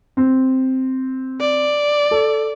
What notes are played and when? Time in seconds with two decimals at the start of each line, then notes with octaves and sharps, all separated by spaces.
0.17 C4
1.41 D5
2.11 A4